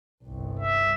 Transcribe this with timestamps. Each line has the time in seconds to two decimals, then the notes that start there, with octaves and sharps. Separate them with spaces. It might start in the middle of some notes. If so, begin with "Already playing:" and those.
0.24 G1 C2
0.60 E5